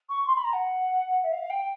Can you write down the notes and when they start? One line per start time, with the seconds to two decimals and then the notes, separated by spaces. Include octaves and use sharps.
0.09 C#6
0.26 C6
0.35 B5
0.44 A#5
0.53 F#5
1.24 E5
1.32 F5
1.50 G5